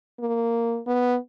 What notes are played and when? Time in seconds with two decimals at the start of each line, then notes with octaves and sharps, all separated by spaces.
0.20 A#3
0.87 B3